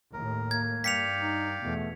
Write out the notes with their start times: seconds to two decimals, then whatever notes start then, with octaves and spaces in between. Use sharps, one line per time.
0.13 D#2 A2 A#4
0.51 A#3 G#6
0.84 G2 D5 F5 G5 B6 C#7 F7
1.20 D#4
1.61 E2 B2 A3